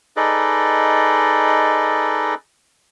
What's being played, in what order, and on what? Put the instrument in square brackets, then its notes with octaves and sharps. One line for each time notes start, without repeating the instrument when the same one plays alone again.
[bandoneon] D#4 G#4 A4 B4 D5 D#5